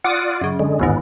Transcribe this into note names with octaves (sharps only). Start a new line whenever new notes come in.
F4 D5 F#5 D6 D#6
F#2 C#3
D3 G#3
G1 D#2 G#2 B3